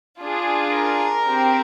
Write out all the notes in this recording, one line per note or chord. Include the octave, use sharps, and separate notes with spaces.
D4 F4 G#4
A#4
C4 G4